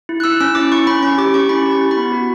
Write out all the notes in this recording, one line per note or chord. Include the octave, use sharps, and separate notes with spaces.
E4
F#6
E4 E6
C#4 E6
E4 D6
E4 C#6
C#4 B5
C#4 C#6
G4 D6
C#4 C#6
E4 B5
G4
C#6
E4
B5
B3
F#4